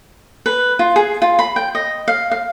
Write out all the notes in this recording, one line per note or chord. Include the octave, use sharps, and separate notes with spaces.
B4
F4
G#4
F4
B5
G5
D#5
F5
F5